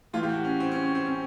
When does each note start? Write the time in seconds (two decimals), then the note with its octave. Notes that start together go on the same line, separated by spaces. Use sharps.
0.14 A2 E3 F4
0.23 G4
0.29 F#4
0.45 C#4
0.60 C4
0.71 C#4
0.83 C4
0.95 C4
1.07 C#4